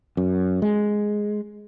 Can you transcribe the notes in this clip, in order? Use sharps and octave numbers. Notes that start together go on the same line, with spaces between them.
F#2
G#3